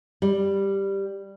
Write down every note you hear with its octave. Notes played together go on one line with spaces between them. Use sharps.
G3